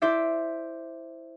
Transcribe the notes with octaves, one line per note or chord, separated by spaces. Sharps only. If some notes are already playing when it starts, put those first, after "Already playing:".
E4 C5 D5 E5